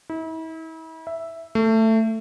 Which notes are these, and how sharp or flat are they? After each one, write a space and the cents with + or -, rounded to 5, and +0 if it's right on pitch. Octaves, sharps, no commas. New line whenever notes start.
E4 -40
E5 +0
A3 +15